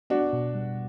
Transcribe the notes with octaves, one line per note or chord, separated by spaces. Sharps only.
B3 D4 F#4
B2
G3